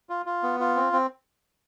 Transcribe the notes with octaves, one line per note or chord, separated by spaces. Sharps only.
F4
F4
B3
F4
C4
C4